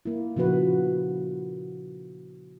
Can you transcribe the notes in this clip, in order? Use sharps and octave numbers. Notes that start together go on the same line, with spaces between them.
A#3 E4
A#2 C#3 F3 F#4 B4